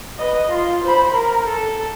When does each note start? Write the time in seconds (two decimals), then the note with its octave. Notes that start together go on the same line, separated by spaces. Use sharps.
0.19 B4 D#5
0.49 F4 C6
0.84 C5 B5
1.14 A#4
1.47 A4